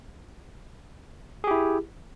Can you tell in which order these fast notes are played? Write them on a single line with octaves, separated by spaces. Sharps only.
G#4 G4 E4